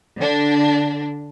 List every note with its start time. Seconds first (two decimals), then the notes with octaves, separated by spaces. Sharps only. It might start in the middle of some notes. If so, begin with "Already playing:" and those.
0.21 D3 D4